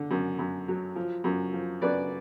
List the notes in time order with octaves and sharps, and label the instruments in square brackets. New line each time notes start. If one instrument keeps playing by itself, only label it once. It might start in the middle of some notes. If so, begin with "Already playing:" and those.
Already playing: [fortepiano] D3
F#2
F#2
F#3
F3
F#2
F3
F#2 B4 D5